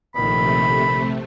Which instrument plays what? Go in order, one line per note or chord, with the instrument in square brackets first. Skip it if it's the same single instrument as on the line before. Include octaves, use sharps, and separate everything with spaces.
[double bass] A#1 D#3 [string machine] C3 A3 [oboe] B5